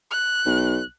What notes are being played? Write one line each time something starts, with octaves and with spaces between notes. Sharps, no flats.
F#6
B1